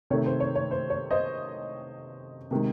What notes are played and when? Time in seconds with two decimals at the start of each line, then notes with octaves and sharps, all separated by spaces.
0.10 C3 D#3 A3 C#5
0.26 C5
0.40 C#5
0.55 C#5
0.71 C5
0.90 C#5
1.11 C5 D#5
2.51 C3 D#3 G#3